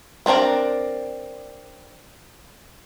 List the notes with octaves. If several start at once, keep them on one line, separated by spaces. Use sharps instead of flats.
B3 C4 D4 A#4 D5